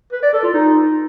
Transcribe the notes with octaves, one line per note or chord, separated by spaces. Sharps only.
B4
D5
A4
F4
D#4